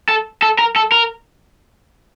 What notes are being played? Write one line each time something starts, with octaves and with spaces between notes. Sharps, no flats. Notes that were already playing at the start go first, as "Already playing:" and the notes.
A4
A4
A#4
A4
A#4